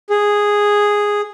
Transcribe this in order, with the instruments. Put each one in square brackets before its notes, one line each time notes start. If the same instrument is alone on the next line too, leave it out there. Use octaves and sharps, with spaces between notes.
[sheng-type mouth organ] G#4